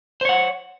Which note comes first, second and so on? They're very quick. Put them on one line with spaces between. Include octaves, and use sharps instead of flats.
C5 C#5 F#5